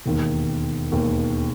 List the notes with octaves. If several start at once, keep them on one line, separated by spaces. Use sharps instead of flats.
E1 D#2 D#3
E1 D#2 D#3